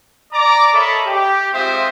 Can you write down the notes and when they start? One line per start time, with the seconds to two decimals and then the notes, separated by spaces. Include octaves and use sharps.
0.32 D5 A#5 D6
0.73 A4 A#4 C#5 D#5 E5 B5
1.06 G4
1.53 G#3 C4 F4 C5 E5 D#6